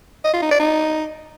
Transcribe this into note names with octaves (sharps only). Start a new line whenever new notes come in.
D#5
F4
D#4
D5
D#4